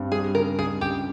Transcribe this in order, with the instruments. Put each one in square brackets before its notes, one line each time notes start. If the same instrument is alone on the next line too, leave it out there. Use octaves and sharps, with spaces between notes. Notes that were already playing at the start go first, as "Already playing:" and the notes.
Already playing: [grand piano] G2 C4
[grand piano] G3 [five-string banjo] G#4
[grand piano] C#3 [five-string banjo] A#4
[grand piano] C#2 [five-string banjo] G#4
[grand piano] C#2 [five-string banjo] G4